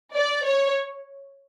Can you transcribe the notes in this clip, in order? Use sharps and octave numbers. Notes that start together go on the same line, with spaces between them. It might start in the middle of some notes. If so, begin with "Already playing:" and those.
D5
C#5